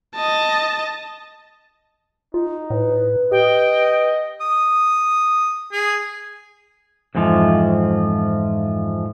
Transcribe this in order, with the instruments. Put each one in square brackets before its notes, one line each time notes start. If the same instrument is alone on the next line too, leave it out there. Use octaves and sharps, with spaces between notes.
[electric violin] D#5 A5
[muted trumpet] D#4 [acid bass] F4
[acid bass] A2 [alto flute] B4
[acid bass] G4 [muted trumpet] D#5 [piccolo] G5
[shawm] D#6
G#4
[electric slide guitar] F2 G#2 E3 F3